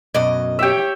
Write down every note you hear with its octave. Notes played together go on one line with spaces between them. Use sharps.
F#2 B2 D5 D#5
G4 C#5 E5 G5